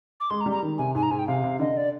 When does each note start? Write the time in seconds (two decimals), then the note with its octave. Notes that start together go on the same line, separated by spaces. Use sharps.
0.20 D6
0.30 G#3 C6
0.41 A#5
0.46 G3
0.51 A#5
0.63 D#3
0.78 C3 G#5
0.95 G#2 G#5
1.03 A#5
1.11 G#2 G#5
1.19 G5
1.28 C3 F5
1.44 C3
1.60 D3 D#5
1.77 D5